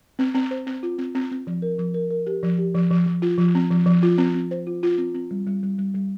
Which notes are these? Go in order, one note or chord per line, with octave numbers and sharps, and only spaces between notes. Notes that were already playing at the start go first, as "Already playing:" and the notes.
C4
C4
C5
C4
F4
C4
C4
C4
F3
A#4
F3
A#4
A#4
G4
F3
G4
F3
F3
F3
F4
F3
C4
F3
F3
F4
C4
C4
C5
F4
F4
C4
C4
G3
G3
G3
G3
G3